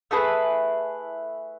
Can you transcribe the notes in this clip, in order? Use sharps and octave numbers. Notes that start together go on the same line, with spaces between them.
A3 E4 G#4 B4